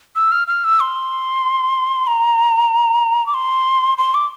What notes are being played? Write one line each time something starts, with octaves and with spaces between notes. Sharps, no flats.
E6
F6
F6
E6
C6
A#5
D6
C6
C6
D6